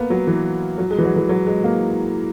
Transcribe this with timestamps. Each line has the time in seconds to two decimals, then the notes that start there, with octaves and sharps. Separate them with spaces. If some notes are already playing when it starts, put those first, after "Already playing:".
Already playing: A#3 B3
0.10 F#3
0.27 E3
0.78 F#3
0.91 G#3
0.98 E3
1.04 F#3
1.16 E3
1.29 F#3
1.47 G#3
1.64 A#3